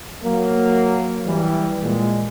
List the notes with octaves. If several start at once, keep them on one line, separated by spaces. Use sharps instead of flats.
F#3 A#3
E3 G3
A#2 G#3